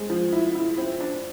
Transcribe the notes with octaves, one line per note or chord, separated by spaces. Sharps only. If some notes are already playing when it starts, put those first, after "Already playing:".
Already playing: G#3 C4
F3
E4
E4
C4
D4